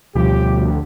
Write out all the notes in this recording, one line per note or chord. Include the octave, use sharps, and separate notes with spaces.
D2 B2 F3 G3 G4